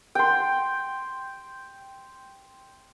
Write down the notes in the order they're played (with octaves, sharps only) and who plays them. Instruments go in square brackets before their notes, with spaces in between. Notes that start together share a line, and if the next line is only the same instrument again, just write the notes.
[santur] G5 C6